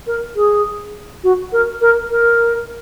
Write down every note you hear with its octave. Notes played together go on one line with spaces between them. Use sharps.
A#4
G#4
F#4
A#4
A#4
A#4